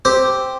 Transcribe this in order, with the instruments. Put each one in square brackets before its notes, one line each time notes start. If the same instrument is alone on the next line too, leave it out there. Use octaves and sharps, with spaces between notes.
[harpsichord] C4 G4